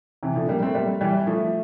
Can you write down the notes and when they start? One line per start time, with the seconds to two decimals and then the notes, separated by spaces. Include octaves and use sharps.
0.23 C3 E3
0.36 D3 F3
0.49 G3 A#3
0.62 A3 C4
0.75 G3 A#3
1.01 E3 G3
1.27 F3 A3